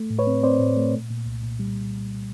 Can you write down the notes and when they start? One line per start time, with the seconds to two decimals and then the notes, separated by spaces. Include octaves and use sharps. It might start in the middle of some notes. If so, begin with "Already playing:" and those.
Already playing: A3
0.10 A2
0.19 B4 C#5
0.27 C4
0.43 C4 C5 D5
0.60 A2
0.77 A3
0.94 A#2
1.10 A#2
1.26 C2
1.43 A#2
1.59 G3